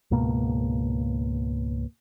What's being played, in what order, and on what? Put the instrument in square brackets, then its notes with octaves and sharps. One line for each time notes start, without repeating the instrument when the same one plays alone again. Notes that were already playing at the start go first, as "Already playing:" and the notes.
[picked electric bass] C#2 G#2 B2 A#3